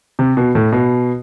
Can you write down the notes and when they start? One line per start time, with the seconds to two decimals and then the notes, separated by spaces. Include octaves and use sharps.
0.19 C3
0.37 B2
0.55 A2
0.72 B2